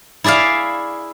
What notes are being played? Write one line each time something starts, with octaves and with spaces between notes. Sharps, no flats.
E4 G#4 D5 E5 F5